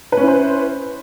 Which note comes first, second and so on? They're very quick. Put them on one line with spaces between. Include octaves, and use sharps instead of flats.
B4 C#4 E4 C5